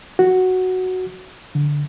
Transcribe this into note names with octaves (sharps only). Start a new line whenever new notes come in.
F#4
D3